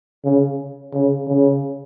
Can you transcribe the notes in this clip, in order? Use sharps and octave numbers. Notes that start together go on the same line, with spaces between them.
C#3
C#3
C#3